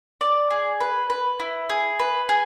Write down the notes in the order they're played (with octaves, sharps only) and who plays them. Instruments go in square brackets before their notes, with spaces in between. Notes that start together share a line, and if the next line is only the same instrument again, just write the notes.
[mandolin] D5
G#4
B4
B4
E4
G#4
B4
G#4